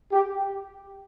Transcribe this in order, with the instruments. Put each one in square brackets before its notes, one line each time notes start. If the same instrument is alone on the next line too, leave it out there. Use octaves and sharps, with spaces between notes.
[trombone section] G4